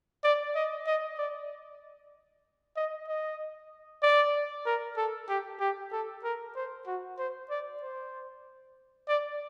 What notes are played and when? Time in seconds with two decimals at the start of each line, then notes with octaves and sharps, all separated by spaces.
0.24 D5
0.55 D#5
0.87 D#5
1.18 D5
2.76 D#5
3.08 D#5
4.03 D5
4.66 A#4
4.97 A4
5.29 G4
5.60 G4
5.92 A4
6.24 A#4
6.55 C5
6.87 F#4
7.19 C5
7.50 D5
7.82 C5
9.08 D5